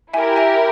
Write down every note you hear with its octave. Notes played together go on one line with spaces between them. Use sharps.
E4 G4 A#4 E5 G#5
E5 G#5